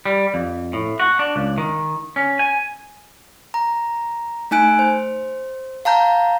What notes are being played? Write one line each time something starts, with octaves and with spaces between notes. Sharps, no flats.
G3
F2
A2
F#4
D4
C#2
D#3
C#4
G#5
A#5
A3 D#4 G#5 F#6 D7
C5
F5 A5 A#5 G6